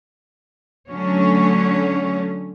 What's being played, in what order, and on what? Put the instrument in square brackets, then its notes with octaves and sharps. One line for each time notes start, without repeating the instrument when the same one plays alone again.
[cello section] D3 F#3 A3 C#4 C#5